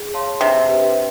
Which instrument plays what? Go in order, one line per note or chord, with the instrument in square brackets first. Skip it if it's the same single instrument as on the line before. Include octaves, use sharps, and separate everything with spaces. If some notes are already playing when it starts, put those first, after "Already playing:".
Already playing: [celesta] G#4
C#5 F5 A5 C6
[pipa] C3 [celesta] D4
[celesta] G4 B4